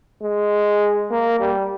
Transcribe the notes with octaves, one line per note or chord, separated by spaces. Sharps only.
G#3
A#3
G3